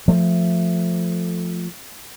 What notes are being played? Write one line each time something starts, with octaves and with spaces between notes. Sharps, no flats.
F3 A3